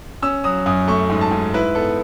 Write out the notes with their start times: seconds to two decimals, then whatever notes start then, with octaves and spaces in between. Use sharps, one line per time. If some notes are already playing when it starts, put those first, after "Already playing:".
0.22 C#4 E6
0.44 F#3 D#6
0.66 F#2 D#6
0.87 A3 C#6
1.09 G#2
1.21 A5
1.31 G#2
1.54 E4 B4
1.75 B3 A4